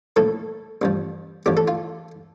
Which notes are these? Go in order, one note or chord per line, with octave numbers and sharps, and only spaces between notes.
A#1 A2 F3 A4
A1 G2 F3
A1 A2 F3 G4
A4
F4